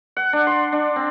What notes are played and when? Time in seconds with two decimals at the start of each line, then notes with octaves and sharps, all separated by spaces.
0.17 F#5
0.33 D4
0.47 C6
0.72 D4
0.96 C4